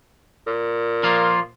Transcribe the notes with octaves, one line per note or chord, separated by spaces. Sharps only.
A#2
F3 A#3 F4